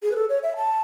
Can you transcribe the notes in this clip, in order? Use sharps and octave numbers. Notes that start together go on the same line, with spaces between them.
G#4
B4
A4
C#5
E5
A5